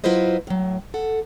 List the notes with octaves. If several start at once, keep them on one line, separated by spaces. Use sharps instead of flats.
F#3 E4 F4 B4 C5 D#5
A2 F#3
A4 F#5